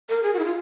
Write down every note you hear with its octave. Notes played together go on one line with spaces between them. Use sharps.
A#4
G#4
F#4
E4
F4